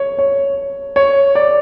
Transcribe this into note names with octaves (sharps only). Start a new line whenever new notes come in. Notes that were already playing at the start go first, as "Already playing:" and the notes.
Already playing: C#5
C#5
C#5
D5